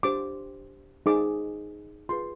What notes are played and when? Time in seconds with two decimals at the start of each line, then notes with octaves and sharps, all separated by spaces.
0.03 D4 G4 C5 D6
1.06 D#4 G#4 C5 D6
2.09 F4 G#4 B4 C6